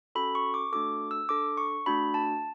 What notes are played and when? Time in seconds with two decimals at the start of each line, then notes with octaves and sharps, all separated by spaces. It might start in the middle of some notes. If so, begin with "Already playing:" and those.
0.15 C#4 F#4 A4 B5
0.35 C#6
0.54 D6
0.73 A3 D4 F#4 A4 D6
1.11 E6
1.29 D4 A4 D6
1.57 C#6
1.86 A3 D4 F#4 B5
2.14 A5